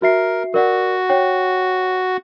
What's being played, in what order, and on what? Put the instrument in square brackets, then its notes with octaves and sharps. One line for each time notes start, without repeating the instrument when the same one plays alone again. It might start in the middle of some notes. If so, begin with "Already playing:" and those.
[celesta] F#4 E5 C7 [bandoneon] A#4
[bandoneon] F#4 [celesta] A#4 D5 F#5
[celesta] C#5 G5